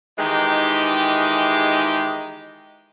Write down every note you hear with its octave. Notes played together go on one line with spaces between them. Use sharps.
D#3 E3 G#3 G4